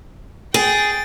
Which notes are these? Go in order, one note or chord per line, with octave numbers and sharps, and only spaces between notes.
G#4 G5 A6